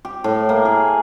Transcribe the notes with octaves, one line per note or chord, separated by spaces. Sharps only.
G4
A2
A#3
G#4